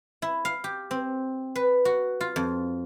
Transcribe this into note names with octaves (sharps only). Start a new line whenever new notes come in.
E4
F5
G4
C4
B4
F#4
F4
F2